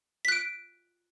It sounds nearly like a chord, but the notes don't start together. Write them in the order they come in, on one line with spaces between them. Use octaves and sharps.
B6 F#6 D7